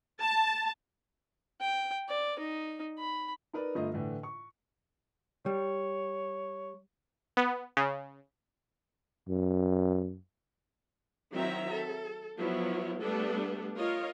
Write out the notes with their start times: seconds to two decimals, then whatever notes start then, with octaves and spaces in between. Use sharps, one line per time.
0.20 A5
1.61 G5
2.09 D5
2.39 D#4
2.98 B5
3.53 D#4 A#4 B4 D5
3.75 G1 A3 F4 D#5
3.94 A2 D3 E3
4.23 C#6
5.46 G3 C#5
7.37 B3
7.77 C#3
9.28 F#2
11.33 D#3 F#3 C4 E4 E5 A#5
11.71 A4
12.38 F3 F#3 B3 E4 C#5
13.01 G3 A3 B3 D4 A4 B4
13.75 F4 A#4 C#5 D#5 F5